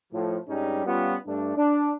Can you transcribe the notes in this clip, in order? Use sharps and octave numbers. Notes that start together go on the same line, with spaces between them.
A2 F3
G2 G3 G#3 C#4 D#4
G3 B3 C#4 F4
G2 A3 D4
D4